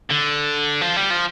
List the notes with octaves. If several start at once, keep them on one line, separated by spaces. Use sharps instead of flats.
D3
F3
G3
F3